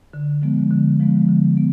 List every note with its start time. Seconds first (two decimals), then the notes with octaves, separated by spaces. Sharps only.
0.13 D3
0.42 F3 G#3 B3
0.71 D3
0.99 F3 G#3 B3
1.29 D3
1.57 B3